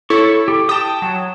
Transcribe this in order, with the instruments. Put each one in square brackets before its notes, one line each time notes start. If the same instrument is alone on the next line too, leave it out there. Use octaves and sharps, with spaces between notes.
[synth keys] E4 A4 C#5 [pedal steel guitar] C#6
[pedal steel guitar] G4
[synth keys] G5 [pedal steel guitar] A5 D#6
[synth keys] F#3